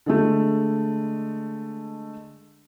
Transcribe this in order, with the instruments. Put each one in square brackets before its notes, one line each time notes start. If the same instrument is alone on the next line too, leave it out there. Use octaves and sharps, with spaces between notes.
[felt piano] D3 G#3 A3